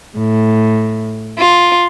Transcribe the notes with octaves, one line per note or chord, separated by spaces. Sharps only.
A2
F4